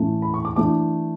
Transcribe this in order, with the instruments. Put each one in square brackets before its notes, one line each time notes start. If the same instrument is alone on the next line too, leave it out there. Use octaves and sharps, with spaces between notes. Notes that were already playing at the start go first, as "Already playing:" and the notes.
Already playing: [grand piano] A2 E3 A3 C#4
B5
C#6
D6
E3 A3 D4 D6